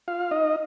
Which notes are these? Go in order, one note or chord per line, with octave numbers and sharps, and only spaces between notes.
F4 F5
D#4 D#5